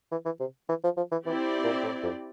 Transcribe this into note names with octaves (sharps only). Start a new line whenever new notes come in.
E3
E3
C3
E3
F3
F3
E3
E3 C4 E4 G4 D5
A#2
A2
F2